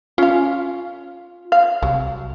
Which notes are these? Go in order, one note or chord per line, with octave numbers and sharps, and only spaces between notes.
C#4 F4 F5
F5
C2 F#3